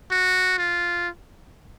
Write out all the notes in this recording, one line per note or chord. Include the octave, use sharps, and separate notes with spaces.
F#4
F4